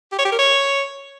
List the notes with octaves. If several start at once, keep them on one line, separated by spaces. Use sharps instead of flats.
G4
C#5
G4
A#4
C#5